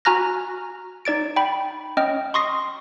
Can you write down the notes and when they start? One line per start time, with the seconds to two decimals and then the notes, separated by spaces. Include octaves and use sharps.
0.05 F#4 G#5 A#5 F6 F#6 A#6
1.05 D#4 D5 A6 D7
1.36 G5 B5
1.97 C#4 D#5 G5 F6
2.34 C6 C#6 D#6 A#6 C7